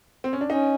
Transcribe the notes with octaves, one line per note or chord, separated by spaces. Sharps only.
C4
C#4
D4
C#4 D#4